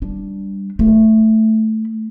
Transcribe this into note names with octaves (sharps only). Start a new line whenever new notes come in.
G3 D4
A3 E4